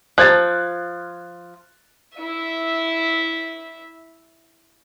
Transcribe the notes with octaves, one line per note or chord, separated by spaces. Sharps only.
F3 F#6 G#6 A6
E4 E5